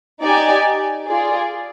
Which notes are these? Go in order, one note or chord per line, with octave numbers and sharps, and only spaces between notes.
D#4 G4 D5 G#5
F4 G#4 D5